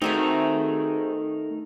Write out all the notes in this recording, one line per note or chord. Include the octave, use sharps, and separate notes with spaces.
A3 C4 D#4 F#4 G#4 A#4